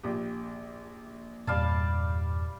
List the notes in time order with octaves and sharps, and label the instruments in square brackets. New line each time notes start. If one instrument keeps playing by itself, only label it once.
[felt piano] A#1 G4
[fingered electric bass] E2 G2 A#2 [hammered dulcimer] G3 F5 A5